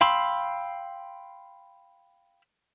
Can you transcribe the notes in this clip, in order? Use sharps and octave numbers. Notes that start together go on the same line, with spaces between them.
F5 G5 B5 C6 E6